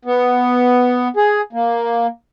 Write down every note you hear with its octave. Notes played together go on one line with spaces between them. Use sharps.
B3
G#4
A#3